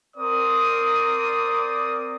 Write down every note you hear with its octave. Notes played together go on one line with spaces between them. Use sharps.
C4 A#4 D5 D#6